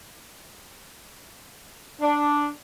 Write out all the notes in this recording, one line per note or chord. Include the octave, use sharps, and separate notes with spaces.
D4